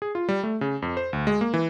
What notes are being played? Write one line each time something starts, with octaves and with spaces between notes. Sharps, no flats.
G#4
F4
G3
A3
C#3
F2
C5
D2
G#3
A#3
E3